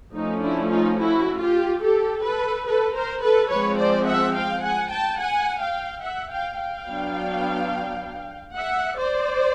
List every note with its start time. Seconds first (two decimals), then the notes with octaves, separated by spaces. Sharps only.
0.15 F3 A3 C#4 D#4
0.43 D4 E4
0.71 D#4 F4
0.99 E4 F#4
1.40 F4 G4
1.83 G4 A4
2.25 A4 B4
2.67 A4 B4
2.95 A#4 C5
3.23 A4 B4
3.51 F3 G#3 C4 B4 C#5
3.79 C5 D5
4.07 E5 F#5
4.35 F5 G5
4.63 F#5 G#5
4.91 G5 A5
5.20 F#5 G#5
5.61 F5 G5
6.03 E5 F#5
6.31 F5 G5
6.60 F5 G5
6.88 F#3 B3 D4
8.56 E5 F#5
8.98 C5 D5